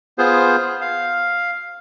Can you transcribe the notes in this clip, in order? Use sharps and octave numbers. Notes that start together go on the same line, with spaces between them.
B3 F4 G#4 C5
F5